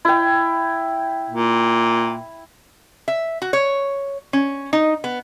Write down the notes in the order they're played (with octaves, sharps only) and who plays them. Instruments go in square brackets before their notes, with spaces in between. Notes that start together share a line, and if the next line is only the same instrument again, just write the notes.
[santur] E4 G5
[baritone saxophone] A#2
[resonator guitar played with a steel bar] E5
F#4
C#5
C#4
D#4
B3